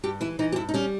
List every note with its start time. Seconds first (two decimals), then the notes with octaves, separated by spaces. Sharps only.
0.03 G2 G4
0.21 E3 E4
0.39 E3 D#4
0.52 G4
0.56 G2 E4
0.69 D#4
0.74 G3 C#4